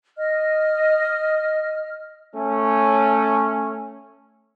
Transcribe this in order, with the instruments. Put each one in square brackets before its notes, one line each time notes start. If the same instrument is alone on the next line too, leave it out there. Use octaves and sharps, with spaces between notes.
[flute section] D#5 F6
[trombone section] A3 C#4